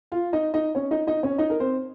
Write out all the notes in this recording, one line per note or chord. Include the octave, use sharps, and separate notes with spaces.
F4 F5
D#4 D#5
D#4 D#5
C#4 C#5
D#4 D#5
D#4 D#5
C#4 C#5
D#4 D#5
A#4
C4 C5